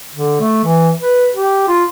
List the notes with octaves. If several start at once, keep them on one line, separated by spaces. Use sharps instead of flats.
D3
A3
E3
B4
G4
F4